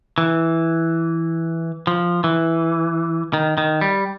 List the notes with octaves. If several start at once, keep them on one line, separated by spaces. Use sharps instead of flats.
E3
F3
E3
D#3
D#3
G3